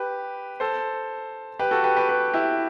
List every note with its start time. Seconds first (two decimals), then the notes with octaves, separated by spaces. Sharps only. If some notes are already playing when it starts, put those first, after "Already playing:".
Already playing: G4 B4
0.60 A4 C5
1.59 G4 B4
1.71 F#4 A4
1.84 G4 B4
1.97 G4 B4
2.09 G4 B4
2.34 E4 G4